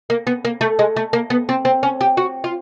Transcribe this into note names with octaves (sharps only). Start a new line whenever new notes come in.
A#3
B3
A#3
A3
G#3
A3
A#3
B3
C4
C4
C#4
G4
F#4
F4